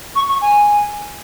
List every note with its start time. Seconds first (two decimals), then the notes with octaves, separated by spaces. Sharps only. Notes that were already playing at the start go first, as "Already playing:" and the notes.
0.15 C#6
0.28 C#6
0.41 G#5